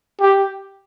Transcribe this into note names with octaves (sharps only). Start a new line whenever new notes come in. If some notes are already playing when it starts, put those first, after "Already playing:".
G4